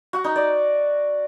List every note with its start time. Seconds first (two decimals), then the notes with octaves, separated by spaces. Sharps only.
0.13 F#4
0.24 D#4
0.36 D5